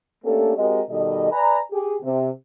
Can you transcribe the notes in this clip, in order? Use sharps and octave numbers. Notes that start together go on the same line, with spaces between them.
A3 A#3 C#4 D4 G4 A4
G#3 C4 F#4 G4 A#4 D#5
B2 D#3 G3 A4 D#5
B4 D5 G#5 A#5
G4 G#4
C3